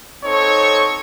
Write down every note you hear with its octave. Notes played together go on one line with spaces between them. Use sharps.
C4 D#4 A4 C#5 C#6